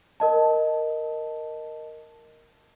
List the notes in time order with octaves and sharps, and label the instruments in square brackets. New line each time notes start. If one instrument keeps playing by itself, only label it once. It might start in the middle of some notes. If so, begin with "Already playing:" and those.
[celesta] A#4 D#5 A5